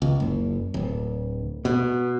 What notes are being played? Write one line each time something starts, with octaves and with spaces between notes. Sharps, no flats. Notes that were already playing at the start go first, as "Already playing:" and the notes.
C#2
F#1
D1
B2